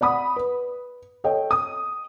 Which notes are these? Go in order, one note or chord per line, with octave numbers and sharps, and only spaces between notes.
D5 F#5 B5 D#6
B4
A4 C#5 D#5 G5
D#6